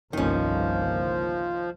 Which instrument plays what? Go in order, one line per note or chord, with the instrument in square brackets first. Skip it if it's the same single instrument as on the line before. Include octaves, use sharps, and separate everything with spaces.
[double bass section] G1 C2 A#3 [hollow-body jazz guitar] D#3 C#4 [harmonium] F3